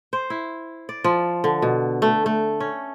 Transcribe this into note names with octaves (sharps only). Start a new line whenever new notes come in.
C5
E4
D5
F3
D3
B2
A3
A3
C#4